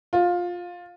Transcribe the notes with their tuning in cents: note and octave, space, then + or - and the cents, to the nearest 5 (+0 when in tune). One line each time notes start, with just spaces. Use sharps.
F4 +15